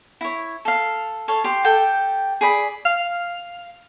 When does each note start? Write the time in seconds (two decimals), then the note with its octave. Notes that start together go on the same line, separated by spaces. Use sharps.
0.21 E4 C#5
0.65 A4 F5
1.28 A4 C#5 F5
1.44 G4 C6
1.64 G4 A4 G5
2.41 G#4 D5 B5
2.85 F5